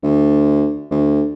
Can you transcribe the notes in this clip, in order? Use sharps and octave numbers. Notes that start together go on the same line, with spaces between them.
D2
D2